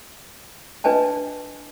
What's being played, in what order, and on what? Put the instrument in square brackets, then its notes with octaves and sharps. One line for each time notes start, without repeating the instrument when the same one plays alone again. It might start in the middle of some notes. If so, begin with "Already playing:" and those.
[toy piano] D4 B4 D#5 G#5 A5